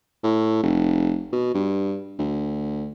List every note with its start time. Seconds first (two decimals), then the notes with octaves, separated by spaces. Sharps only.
0.23 A2
0.63 F1
1.32 B2
1.54 G2
2.19 D2